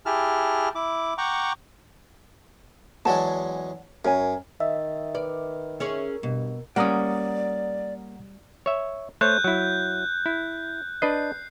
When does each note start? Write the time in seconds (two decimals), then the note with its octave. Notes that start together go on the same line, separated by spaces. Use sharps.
0.06 E4 G4 G#4 A5 F6
0.75 E4 D6
1.18 F#5 G5 A#5 C#6 D6
3.05 E2 F#3 G#3 D5 F#5 A5
4.05 F#2 A#4 C#5 G#5
4.60 D#3 D#5 E5
5.15 B4 D5
5.80 C#4 G#4 A#4 C#5
6.23 G2 B2
6.76 G3 A#3 C#4 D5 F#5 A#5 D#6
8.66 C#5 E5
9.21 A3 C5 C#5 F#6 G6
9.44 F#3 E4
10.26 E4
11.02 D4 B4 D#5 C7